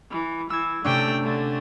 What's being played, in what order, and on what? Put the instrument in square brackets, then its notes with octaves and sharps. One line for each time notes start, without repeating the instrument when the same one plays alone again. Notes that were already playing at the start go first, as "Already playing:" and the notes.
[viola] E3
[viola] E3 [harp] E6 G#6
[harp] C3 C#4 D4 [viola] A3 G5
[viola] D3 A3